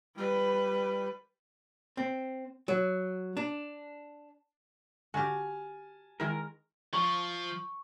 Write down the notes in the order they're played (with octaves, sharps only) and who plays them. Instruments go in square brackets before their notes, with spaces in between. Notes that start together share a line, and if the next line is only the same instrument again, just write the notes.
[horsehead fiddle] G3 B4
[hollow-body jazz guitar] C4
F#3
D4
[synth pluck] D3 [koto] F#4 G4 [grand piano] G#5 A5 F6
[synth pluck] D#3 E4 [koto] G#3 [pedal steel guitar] A#4
[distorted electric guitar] F3 [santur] C#6